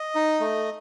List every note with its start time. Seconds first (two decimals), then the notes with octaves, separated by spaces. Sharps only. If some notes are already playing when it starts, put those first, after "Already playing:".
Already playing: D#5
0.15 D#4
0.40 A3